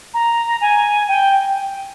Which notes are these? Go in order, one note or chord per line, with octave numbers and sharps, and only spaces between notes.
A#5
G#5
G5